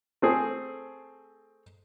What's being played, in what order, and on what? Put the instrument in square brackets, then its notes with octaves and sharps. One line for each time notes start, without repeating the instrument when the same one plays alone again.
[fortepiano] A3 C4 G#4